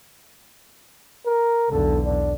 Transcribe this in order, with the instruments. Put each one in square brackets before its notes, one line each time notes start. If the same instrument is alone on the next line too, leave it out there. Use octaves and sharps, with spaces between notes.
[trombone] A#4
[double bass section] B1 E2 D3 [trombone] A4
[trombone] D4